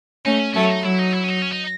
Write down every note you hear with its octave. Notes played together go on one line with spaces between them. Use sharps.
A3 C#4 D#4
C#4
F#3 A3 C#4
D#4
F#3 E4
D#4
E4
C#4
D#4
C#4
D#4